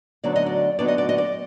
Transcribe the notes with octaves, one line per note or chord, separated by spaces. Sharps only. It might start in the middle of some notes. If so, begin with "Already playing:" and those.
D2 D3 F#3 B3 D#4 D5
D#5
D5
D2 D3 F#3 B3 D#4 D5
D#5
D5
D#5
D5